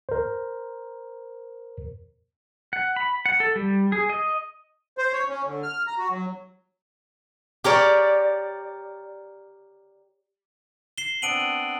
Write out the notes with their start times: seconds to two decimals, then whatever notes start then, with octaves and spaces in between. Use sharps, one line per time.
0.09 A#4 C5
2.73 F#5
2.96 B5
3.26 F#5
3.40 A4
3.56 G3
3.92 G#4
4.09 D#5
4.98 C5
5.13 C#5
5.29 C#4
5.45 D3
5.63 F6
5.87 A#5
5.98 F#4
6.10 F#3
7.64 G4 A#4 C#5 D5
10.98 C7 E7 G7
11.22 B3 C4 D4 D7 D#7 F#7